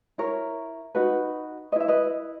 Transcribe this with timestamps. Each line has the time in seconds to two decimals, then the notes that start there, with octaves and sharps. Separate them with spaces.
0.18 E4 A#4 C#5
0.95 D#4 F#4 B4
1.72 B4 D#5
1.76 E4 E5
1.88 B4 D#5